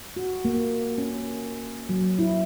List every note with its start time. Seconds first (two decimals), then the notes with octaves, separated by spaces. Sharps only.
0.16 F#4
0.45 A#3
0.98 C#4
1.89 F#3
2.19 E4